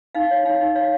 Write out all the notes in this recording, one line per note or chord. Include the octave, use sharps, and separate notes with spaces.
D#4 F5
C#5
D#4 F5
D#4
C#5 F5